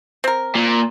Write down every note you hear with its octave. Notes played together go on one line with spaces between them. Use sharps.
C4 A#4
A#2